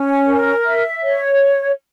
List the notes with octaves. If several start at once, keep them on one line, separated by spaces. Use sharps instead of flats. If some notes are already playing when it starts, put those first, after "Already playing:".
Already playing: C#4
A#4
E5
C#5